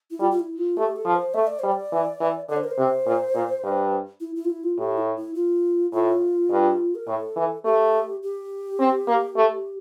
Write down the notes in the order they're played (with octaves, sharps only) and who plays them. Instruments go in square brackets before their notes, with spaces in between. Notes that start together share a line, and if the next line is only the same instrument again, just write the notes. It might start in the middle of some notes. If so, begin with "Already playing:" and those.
[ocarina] E4
[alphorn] G3 [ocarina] F4
[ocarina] F4
E4
F4
[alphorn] A3 [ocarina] G4
[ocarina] A4
[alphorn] F3
[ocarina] C5
[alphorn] A3 [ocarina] E5
[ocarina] D5
[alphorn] G3 [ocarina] C5
[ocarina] D5
[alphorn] E3
E3
[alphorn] D3 [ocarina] D5
[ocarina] C5
A#4
C5
[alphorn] C3
A#2
A#2
G2
[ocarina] E4
E4
F4
E4
F4
[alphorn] A2 [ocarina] G4
[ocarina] E4
E4
F4
[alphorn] A2 [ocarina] F4
[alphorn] G2
[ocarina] A#4
[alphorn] A2 [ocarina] A4
[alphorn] E3
[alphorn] A3 [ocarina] G4
[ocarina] G4
[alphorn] C4
A#3
A3